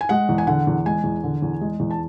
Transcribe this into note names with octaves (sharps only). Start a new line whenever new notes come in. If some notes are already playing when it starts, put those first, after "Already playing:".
G#5
G#3 F#5
E2
G#5
D3 F#5
E2
G#3 G#5
E2
D3
E2
G#3
E2
A5